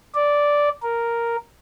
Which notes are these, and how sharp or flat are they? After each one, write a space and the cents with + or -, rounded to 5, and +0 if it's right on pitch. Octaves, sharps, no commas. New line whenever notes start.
D5 -5
A#4 +0